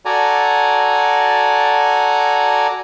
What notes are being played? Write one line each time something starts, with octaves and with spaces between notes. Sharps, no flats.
F#4 A4 D5 G#5 A#5